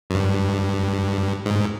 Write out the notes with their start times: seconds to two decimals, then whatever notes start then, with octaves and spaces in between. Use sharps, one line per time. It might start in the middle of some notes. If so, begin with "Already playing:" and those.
0.10 F#2
0.15 G2
1.46 G#2